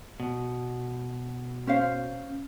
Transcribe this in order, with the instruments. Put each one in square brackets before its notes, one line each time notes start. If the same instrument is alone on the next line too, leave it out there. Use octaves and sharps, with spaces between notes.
[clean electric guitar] B2
[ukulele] C#4 C5 F5